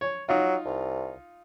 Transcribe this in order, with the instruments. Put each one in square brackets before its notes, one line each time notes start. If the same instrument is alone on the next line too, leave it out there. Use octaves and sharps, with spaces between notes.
[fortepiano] C#5
[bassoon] F#3 [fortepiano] D#4 F4
[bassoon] C2